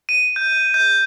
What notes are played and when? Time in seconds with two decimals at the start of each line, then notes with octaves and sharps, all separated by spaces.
0.09 D#7
0.36 G6
0.74 G6